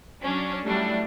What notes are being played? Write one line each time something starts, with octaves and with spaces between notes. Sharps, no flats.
F#3 C#4 D4
F#3 G3 A3 D4 E4